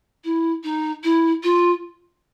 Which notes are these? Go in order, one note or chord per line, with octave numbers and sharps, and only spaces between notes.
E4
D#4
E4
F4